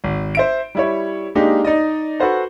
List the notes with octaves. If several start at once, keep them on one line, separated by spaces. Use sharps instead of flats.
G#1
C5 E5 D7
G3 E4 C#5
G#3 A#3 D4 D#4 G4
D#4 D5 D#5
F#4 A4 B4 C5 F#5